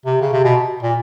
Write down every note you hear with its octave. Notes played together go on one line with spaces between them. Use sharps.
C3
C#3
C3
B2
A#2